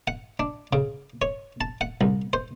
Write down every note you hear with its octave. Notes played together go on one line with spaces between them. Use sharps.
F#5
D4
C#3
C#5
A5
F#5
C2
C5